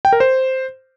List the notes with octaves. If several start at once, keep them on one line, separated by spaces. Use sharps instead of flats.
G5
A#4
C5